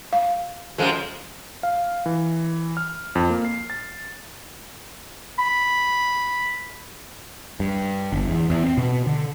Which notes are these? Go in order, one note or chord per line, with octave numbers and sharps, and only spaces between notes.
F5
F#2 F3 G#3 A4
F5
E3
F6
F2
A#3
C7
A6
B5
G2
G1
E2
E2
C4
B2
D3